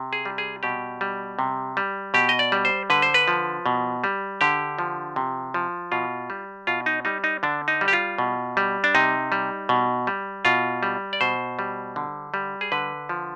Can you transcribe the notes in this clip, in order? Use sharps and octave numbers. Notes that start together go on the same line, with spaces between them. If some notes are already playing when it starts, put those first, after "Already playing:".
Already playing: C3
G#4
G3
G#4
B2 G4
G3
C3
G3
B2 G4
D#5
D5
G3
C5
D3 B4
C5
B4
F3
B2
G3
D3 G4
F3
C3
F3
B2 F4
G3
B2 F4
D#4
G3 D#4
D#4
D3 D4
D#4
G3
G4
F4
B2
G3
D4
C3 D#4
G3
B2
G3
B2 F4
G3
D5
B2 C5
G3
D3
G3
G#4
D3 B4
F3